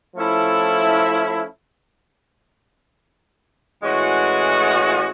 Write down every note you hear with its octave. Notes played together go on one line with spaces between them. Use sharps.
F3 A3 C#4 E4 A4
A2 E3 G#3 C#4 F#4